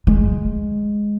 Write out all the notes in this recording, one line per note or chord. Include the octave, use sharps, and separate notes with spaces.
G#3